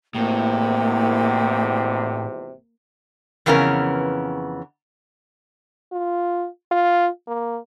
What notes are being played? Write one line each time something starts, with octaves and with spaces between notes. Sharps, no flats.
G#1 E2 A2 C3 A#3 G5
F2 C#3 E3 B3 C#4 A#4
F4
F4
A#3